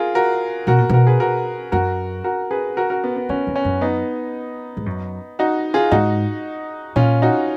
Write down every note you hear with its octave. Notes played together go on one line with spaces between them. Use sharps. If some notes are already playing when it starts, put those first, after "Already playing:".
Already playing: F4 G#4 A#4
F#4 A#4
B2 F#4 A#4
A#2
B2 F#4 A#4
G#4 B4
F#4 A#4
F#2 F#4 A#4
F#4 A#4
G#4 B4
F#4 A#4
F#4 A#4
B3
B3
D#3 C#4
F2
C#4
F#2
B3 D#4
G#2
F#2
D#4 F#4
F4 G#4
G#2 D#4 F#4
A#2 C#4 F4
D#4 F#4